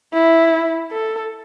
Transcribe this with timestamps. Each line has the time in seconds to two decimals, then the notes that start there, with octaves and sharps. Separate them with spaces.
0.13 E4
0.92 A4